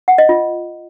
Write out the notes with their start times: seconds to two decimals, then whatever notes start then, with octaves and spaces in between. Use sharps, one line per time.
0.08 F#5
0.18 D#5
0.29 F4